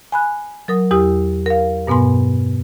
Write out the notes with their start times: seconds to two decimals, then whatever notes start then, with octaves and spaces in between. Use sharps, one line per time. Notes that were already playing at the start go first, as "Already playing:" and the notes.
0.12 G#5 B5 F#6
0.68 F#3 A#4 D#6
0.91 E2 E4 G4 D#6
1.46 A#4 F5
1.87 G2 B2 B3 G#5 C6